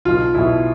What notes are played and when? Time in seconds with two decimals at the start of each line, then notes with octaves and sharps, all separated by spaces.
0.05 B1 B2 F4
0.35 B1 B2 E4